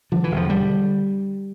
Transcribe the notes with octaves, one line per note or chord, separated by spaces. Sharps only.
D3 F3
E3
E1
F3
D3 G3